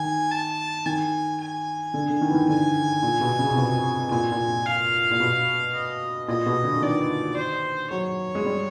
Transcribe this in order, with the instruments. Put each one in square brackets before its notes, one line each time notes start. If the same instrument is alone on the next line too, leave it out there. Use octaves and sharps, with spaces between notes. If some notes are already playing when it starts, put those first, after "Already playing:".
Already playing: [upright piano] D#3 [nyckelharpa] G#5
[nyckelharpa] A5
[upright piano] D#3 [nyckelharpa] G#5
[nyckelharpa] G#5
[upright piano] D3
D3
D#3
E3
D#3
[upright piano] D3 [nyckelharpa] G#5
[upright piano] A#2
B2
C#3
C3
B2
[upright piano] A#2 [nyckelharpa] G#5
[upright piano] A#2
[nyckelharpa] F5
[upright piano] A#2
B2
[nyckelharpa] D#5
[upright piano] A#2 [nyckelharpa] D#5
[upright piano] B2
D3
D3
[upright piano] D#3 [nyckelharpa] D5
[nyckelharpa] C5
[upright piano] F#3 [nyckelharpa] C#5
[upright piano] G#3
G3